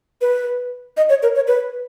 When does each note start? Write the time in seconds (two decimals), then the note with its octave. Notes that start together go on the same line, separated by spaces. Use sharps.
0.21 B4
0.97 D#5
1.09 C#5
1.23 A#4
1.35 C#5
1.48 B4